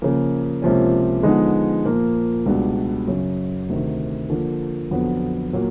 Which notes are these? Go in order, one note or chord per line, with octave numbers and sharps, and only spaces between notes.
C#3 F3 A#3
C#2 C3 F3 A#3 C#4
D3 F3 G#3 B3 D#4
A#2 F3 A#3
C#2 B2 G3 B3 D4
F#2 C#3 F#3
D2 C3 D#3
D3 F3 A#3
F2 D3 F#3 B3
A#2 F#3 A#3